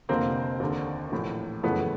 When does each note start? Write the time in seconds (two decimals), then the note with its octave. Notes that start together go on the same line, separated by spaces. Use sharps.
0.09 F1 F2 D3 A#3 C4
0.60 D#2 D3
1.12 A#1 A2 E3
1.63 F#1 F2 C#3 E3 A3 B3